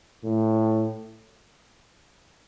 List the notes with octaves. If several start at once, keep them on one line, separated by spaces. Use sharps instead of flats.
A2